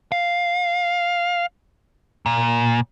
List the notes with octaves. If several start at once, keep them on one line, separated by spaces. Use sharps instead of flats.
F5
A#2